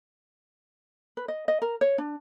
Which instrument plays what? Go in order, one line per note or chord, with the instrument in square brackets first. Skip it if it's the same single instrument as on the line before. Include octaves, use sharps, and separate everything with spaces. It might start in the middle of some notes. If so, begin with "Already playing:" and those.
[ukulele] B4
D#5
D#5
A#4
C#5
D4